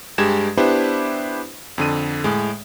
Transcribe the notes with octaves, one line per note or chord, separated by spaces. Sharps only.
G2 G#3 G4 G#6 E7
B3 D4 E4 G4 B4 C5
F2 D3 D#7
A2 G#3